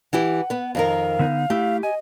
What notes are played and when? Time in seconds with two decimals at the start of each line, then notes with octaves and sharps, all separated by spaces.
0.13 E3 E4 G4 F#5
0.50 B3 B4
0.75 F2 D#3 A#4 F5
1.19 D3 B3 D#4
1.50 A3 E4 G4
1.83 D#5 G#5